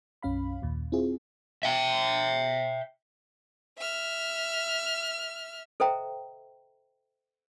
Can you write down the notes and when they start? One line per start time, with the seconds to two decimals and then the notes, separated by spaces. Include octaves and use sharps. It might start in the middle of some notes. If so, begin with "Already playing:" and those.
0.23 B1 F#2 C#4 F5 B5
0.62 D#2 A#2
0.92 C4 E4 F4 G#4
1.63 E5 G5
3.79 E5 F6
5.80 A4 C5 D#5 E5 G5 A#5